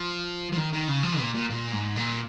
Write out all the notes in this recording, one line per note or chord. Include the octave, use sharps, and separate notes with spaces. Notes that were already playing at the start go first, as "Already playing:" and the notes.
Already playing: F3
F3
D#3
D#3
C#3
F3
A#2
A#2
A#2
G#2
A#2